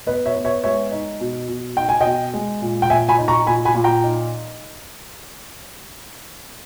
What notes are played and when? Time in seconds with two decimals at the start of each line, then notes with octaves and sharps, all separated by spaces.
0.07 B3 B4 D#5
0.26 C#5 E5
0.36 B3
0.45 C#5 E5
0.63 G#3 C#5 E5
0.92 D#4
1.20 B2
1.48 B2
1.77 D#4 G5
1.89 G#5
2.01 B2 D#5 G5
2.33 G#3
2.62 A#2
2.82 G5
2.90 A#2 E5 G#5
3.09 G#5 B5
3.18 D#4
3.28 A#5 C#6
3.46 A#2 G#5 B5
3.65 G#5 B5
3.75 A#2
3.84 G5 A#5
4.04 D#4